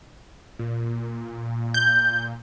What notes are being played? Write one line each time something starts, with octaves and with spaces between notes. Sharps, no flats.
A#2
G6